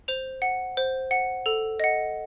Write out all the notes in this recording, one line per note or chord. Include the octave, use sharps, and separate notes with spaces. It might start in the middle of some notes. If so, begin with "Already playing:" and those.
C5 F7
F#5
C5
F#5
A4 F7
D#5 F#5